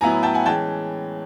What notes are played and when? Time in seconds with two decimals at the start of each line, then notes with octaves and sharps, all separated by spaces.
0.01 A2 F#3 B3 E4 G#5 A#5
0.23 G5 A5
0.34 F#5 G#5
0.46 E3 G#3 C#4 G5 A5